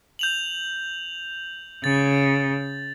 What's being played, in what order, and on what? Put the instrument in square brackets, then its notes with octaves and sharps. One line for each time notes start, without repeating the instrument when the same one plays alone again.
[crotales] G6 F7 F#7
[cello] C#3 [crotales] A6